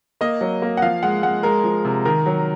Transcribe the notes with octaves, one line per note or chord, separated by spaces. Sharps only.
A#3 D#5
F#3
A#3
F#5
F3 F5
G#3 F#5
G#3 F#5
G#3 A#4
F3
C3
D#3 A#4
F#3